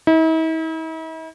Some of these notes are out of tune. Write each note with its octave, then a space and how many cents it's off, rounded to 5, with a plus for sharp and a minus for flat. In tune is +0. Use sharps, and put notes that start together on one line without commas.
E4 -45